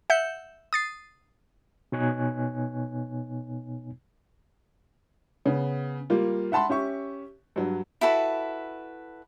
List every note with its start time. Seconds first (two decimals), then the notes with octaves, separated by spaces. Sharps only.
0.10 E5 F#5 G6 C#7
0.73 D#6 A6 C7
1.92 B2 B3 D#4 C#5 G#5 F#6
5.45 C#3 B3
6.10 G3 A#3 F4
6.52 E5 F#5 A5 B5 C6
6.69 C#4 G4 E5 C#6
7.56 G2 F#3
8.01 E4 F#4 A4 B4